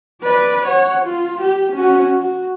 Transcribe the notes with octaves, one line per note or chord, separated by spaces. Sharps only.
B4 D5
C#5 F#5
F4
G4
C#4 F#4
F#4